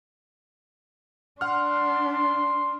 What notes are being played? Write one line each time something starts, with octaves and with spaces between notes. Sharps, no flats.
D4 F#5 C6 F6